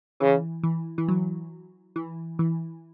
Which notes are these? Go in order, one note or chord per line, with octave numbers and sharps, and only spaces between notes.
C#3 E3
E3
E3
F#3
E3
E3